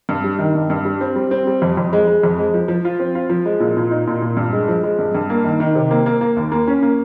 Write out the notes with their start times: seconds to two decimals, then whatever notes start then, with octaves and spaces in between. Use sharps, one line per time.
0.09 G2
0.24 G3
0.39 D#3
0.55 G2
0.70 G2
0.85 G3
1.01 C4
1.16 G3
1.31 C4
1.47 G3
1.62 F2
1.77 F2
1.93 G#3
2.07 G#3
2.23 F2
2.38 G#3
2.54 F3
2.68 F3
2.85 F4
2.99 C4
3.15 F4
3.30 F3
3.46 G#3
3.60 A#2
3.77 A#2
3.91 D#4
4.07 A#2
4.22 A#2
4.37 G2
4.53 G#3
4.68 F3
4.84 G#3
4.99 G2
5.15 G2
5.30 A#3
5.44 D#3
5.60 D#3
5.75 C3
5.91 A#3
6.06 A#3
6.21 A#3
6.36 D#2
6.52 A#3
6.67 C#4
6.82 A#3